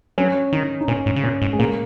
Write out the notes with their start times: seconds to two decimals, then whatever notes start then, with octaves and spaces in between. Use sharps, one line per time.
0.18 F#3 C#4
0.53 D#3 D#4
0.81 D#4
0.88 A#2 C#4
1.06 G#2
1.16 C#3
1.24 A#2 C#4
1.42 G#2
1.53 G#3
1.59 A#2 A#3